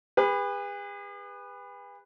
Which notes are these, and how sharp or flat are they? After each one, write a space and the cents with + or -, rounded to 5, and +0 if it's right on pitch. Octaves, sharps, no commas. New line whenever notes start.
G#4 -45 B4 +0